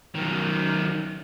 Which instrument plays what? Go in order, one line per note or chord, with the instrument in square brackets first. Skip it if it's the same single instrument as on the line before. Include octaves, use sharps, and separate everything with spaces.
[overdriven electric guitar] F#2 D#3